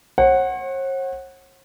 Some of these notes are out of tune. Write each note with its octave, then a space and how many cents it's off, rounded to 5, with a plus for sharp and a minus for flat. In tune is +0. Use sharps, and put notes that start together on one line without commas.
C#5 -45 F#5 +0